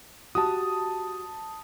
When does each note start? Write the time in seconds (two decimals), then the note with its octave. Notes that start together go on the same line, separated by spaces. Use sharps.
0.35 F#4 G4 A5 D#6